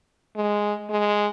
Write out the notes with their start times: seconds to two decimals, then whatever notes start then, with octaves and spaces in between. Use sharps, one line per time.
0.36 G#3
0.90 G#3